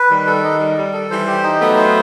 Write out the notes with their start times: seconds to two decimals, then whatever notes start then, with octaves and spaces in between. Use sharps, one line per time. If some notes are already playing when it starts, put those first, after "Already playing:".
Already playing: B4
0.10 D#3 G3
0.27 A4
0.44 D#4
0.60 G3
0.77 G3
0.93 A4
1.11 E3 G3 C5
1.27 G4
1.43 D#4
1.60 F#3 A3 B3
1.76 C5